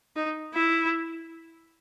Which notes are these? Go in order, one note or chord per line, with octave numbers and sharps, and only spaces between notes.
D#4
E4